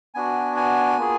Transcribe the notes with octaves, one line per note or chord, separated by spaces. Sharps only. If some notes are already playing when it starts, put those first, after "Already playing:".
B3 D4 F#4 G#5
G#5
A#3 F4 G#4